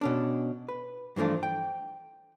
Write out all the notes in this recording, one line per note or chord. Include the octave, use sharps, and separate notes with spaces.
B2 C#4 D4
B4
G2 E3 F3 A3 D4
G5